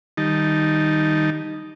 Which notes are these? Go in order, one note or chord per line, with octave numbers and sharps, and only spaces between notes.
D#3 G3 D#4 A5